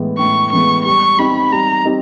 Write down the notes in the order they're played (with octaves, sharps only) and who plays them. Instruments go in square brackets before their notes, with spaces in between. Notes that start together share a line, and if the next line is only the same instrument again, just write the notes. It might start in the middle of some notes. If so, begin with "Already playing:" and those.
Already playing: [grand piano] A2 E3 G#3 B3
[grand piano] A2 [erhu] C#6
[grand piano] E3 G#3 B3 [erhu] C#6
[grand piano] G3 [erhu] C#6
[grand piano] C4 D#4 G4 [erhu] B5
[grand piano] G3 [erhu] A#5
[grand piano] C4 D#4 G4